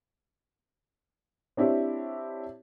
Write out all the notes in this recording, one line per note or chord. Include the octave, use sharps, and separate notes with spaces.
C4 D4 E4 G4 C#5